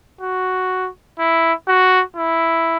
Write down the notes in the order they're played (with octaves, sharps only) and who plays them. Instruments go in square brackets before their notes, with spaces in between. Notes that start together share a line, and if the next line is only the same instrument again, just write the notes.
[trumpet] F#4
E4
F#4
E4